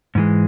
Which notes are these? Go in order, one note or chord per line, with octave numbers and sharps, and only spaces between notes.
G#2 E3 G#3